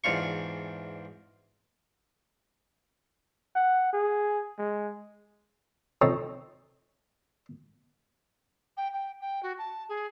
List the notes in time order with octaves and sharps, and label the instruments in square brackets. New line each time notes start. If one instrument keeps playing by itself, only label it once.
[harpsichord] E2 G#2 D4 F4 C#6
[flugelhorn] F#5
G#4
G#3
[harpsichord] F3 C4 C#4 D#4 A4 C#5
[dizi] G5
G5
G5
F#4
A5
G#4